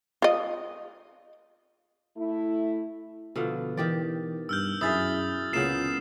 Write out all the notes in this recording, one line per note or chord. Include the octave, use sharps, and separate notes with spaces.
F4 D#5
A3 E4
B2 D3 F3
D#3 E3 G4 D5
G2 E6 F6 G6
F#2 E4 G#4 E5 D#6 A6
C#2 A#2 C#3 B3 C7 E7